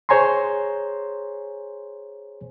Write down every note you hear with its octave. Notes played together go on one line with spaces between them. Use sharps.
G#4 C5 C#5 G#5 A#5 C6